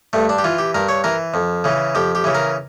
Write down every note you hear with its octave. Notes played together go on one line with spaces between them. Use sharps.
G2 A3
D4
G4
E3 F4
G4
G2 A#4
C#5
E3 A#4
F2
C#3 E3
F2 G4
G4
C#3 E3
A#4